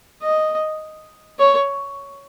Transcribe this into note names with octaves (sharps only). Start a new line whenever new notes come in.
D#5
C#5